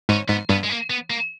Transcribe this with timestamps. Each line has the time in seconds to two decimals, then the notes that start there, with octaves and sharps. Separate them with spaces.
0.09 G#2 C#4
0.29 G#2 B3
0.49 G2 B3
0.64 G#3
0.70 A#3
0.90 B3
1.10 A#3